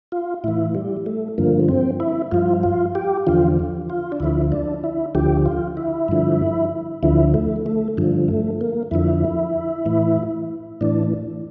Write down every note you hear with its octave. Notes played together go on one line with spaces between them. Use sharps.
F4
A2 E3 E4
G3
A3
G2 D3 F3 A#3
C4
E4
G2 F3 F4
F4
G4
E2 D3 F3 F4
F4
D4
D2 D3 F3 E4
D4
E4
D2 D3 F3 G4
F4
E4
G2 D3 F3
D2 D3 F3 E4
A3
A3
G2 D3 F3
A3
A#3
F2 D3 F3 E4
A2 E3
A2 E3 D4